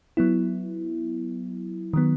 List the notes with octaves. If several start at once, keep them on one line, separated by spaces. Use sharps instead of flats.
F#3 B3 E4
D#3 F#3 B3